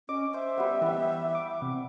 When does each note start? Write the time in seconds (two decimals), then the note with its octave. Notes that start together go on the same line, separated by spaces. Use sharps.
0.09 C#4 D#5 D6
0.34 C5 E5
0.58 G3 B3
0.82 E3 B3 G5
1.35 D6
1.62 C3